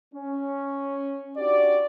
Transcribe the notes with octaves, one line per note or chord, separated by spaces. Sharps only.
C#4
D4 D#4 F#4 G4 D5